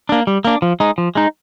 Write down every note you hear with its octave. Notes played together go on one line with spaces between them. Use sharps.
A#3 D4
G3
A#3 D4
F3
G#3 D#4
F3
G#3 D#4